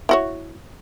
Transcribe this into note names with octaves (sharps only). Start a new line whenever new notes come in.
E4 F#4 C#5